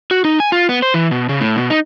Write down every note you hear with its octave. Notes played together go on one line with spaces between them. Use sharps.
F#4
D#4
G#5
F4
B3
C5
E3
B2
C#3
A2
B2
D#4